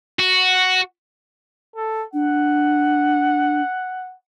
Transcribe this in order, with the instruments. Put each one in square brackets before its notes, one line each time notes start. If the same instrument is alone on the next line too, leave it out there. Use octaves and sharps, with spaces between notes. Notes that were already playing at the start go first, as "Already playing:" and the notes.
[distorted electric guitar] F#4
[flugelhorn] A4
[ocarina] D4 [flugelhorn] F#5